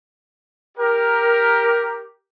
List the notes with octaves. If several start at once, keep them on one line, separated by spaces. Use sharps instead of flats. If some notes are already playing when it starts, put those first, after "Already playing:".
G4 A#4